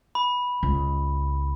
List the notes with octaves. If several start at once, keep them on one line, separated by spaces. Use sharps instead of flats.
B5
C#2